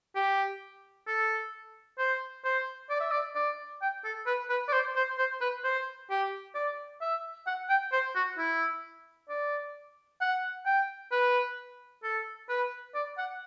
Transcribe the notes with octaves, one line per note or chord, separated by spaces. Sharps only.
G4
A4
C5
C5
D5
E5
D5
D5
G5
A4
B4
B4
D5
C5
C5
C5
B4
C5
G4
D5
E5
F#5
G5
C5
F#4
E4
D5
F#5
G5
B4
A4
B4
D5
F#5